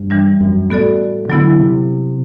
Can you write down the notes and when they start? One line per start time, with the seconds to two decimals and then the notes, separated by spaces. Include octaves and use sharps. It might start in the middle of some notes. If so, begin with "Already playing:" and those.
Already playing: G2
0.10 E3 G3 D4
0.40 F#2
0.70 A2 B3 F#4 A4 D5
1.29 D3 F#3 B3 E4
1.60 C3